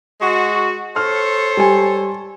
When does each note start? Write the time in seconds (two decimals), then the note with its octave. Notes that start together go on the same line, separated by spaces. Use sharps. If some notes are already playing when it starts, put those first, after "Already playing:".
0.21 G#3 F#4
0.96 A4 C5 C#5 F6
1.57 G3 G#5